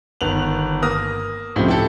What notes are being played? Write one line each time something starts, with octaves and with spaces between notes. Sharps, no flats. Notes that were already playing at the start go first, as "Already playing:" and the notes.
G1 D#3 B3 F7 F#7
A#3 D#6 F6 A#6
C#2 A2 C3 F3 G4
E4 G4 A4